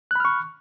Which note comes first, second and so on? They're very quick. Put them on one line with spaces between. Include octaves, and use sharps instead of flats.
F#6 B5 F6 C#6